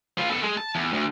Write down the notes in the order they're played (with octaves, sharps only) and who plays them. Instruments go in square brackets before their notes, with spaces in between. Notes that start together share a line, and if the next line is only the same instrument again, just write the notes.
[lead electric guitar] F4 B4
B3 A4
G#3
A5
E2
D2